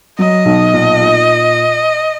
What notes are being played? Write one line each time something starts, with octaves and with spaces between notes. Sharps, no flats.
F#3 D#5
B1
A#2
A#2